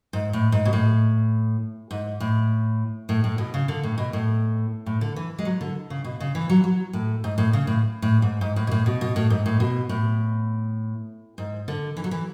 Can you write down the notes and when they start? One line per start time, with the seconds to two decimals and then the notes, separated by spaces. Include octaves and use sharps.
0.13 G#2
0.33 A2
0.52 G#2
0.65 B2
0.73 A2
1.91 G#2
2.20 A2
3.09 A2
3.24 A2
3.38 B2
3.54 C#3
3.68 D3
3.83 A2
3.98 B2
4.13 A2
4.86 A2
5.01 D3
5.16 E3
5.39 G#3
5.45 F#3
5.61 D3
5.90 C#3
6.04 B2
6.20 C#3
6.35 E3
6.49 F#3
6.64 F#3
6.93 A2
7.24 G#2
7.38 A2
7.53 C#3
7.67 A2
8.02 A2
8.22 G#2
8.41 G#2
8.56 A2
8.67 B2
8.71 A2
8.86 B2
9.01 B2
9.16 A2
9.30 G#2
9.46 A2
9.60 B2
9.89 A2
11.38 G#2
11.68 D3
11.97 E3
12.04 F#3
12.11 E3